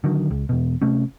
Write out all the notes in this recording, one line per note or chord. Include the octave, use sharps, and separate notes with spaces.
D3 D#3 F#3
C#2
E2 B2
C3 A3 C#4